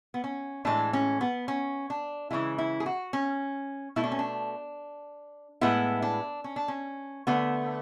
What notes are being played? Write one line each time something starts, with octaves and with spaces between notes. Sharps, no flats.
B3
C#4
A2 E3 G#3 D4
C#4
B3
C#4
D4
C#3 E3 G#3 E4
E4
G#4
F#4
C#4
B2 A3 E4
D4
C#4
D4
A2 G#3 B3 E4
D4
C#4
D4
C#4
D3 A3 B3